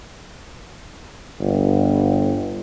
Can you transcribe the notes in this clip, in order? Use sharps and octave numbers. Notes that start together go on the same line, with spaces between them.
G1